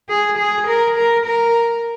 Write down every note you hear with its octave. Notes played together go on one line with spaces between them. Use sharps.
G#4
G#4
A#4
A#4
A#4